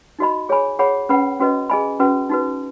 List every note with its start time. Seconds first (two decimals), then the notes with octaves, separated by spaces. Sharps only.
0.19 D#4 F#4 D#5 B5
0.49 G#4 C#5 G#5 B5
0.79 G#4 C#5 F#5 B5
1.09 C#4 B4 F#5 B5
1.40 C#4 F#4 B4 D#5
1.70 G#4 D#5 G#5 B5
2.00 C#4 F#4 B4
2.30 D#4 F#4 B4